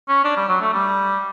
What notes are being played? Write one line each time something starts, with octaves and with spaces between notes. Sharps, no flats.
C#4
D4
G3
F#3
A3
G3